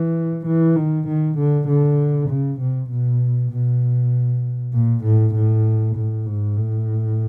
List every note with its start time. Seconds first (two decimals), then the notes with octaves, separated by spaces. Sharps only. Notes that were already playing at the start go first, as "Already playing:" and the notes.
Already playing: E3
0.46 E3
0.76 D#3
1.07 D#3
1.38 D3
1.68 D3
2.29 C#3
2.60 C3
2.90 B2
3.51 B2
4.73 A#2
5.04 A2
5.34 A2
5.96 A2
6.26 G#2
6.57 A2